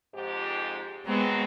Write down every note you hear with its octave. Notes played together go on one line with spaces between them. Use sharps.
F2 G#2 G4
D#3 F#3 G#3 B3 C4